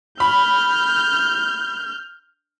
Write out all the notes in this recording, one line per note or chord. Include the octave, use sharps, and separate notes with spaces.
B5 F6 G6